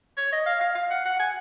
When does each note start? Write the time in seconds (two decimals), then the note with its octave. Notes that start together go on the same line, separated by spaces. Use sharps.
0.17 C#5
0.32 D#5
0.46 F5
0.61 F5
0.75 F5
0.90 F#5
1.05 F#5
1.19 G#5